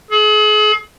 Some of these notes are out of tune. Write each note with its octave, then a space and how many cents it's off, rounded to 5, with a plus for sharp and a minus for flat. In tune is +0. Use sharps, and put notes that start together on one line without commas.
G#4 +40